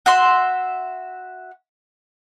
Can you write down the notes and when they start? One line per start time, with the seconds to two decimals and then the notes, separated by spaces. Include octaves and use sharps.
0.06 F#4 E5 C6